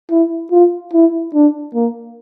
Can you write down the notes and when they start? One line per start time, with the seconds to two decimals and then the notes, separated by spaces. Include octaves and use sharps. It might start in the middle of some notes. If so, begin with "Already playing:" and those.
0.11 E4
0.52 F4
0.93 E4
1.34 D4
1.74 A#3